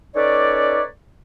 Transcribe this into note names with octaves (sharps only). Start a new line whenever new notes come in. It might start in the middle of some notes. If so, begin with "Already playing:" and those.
C#4 D#4 A4 B4 C#5 D5